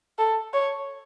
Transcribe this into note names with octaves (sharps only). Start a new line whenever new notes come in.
A4
C#5